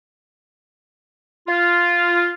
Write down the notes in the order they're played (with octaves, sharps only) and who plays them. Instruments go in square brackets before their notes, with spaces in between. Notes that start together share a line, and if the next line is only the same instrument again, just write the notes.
[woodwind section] F4